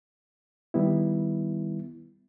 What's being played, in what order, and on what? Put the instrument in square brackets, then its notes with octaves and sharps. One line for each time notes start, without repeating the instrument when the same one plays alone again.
[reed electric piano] D#3 G3 B3 E4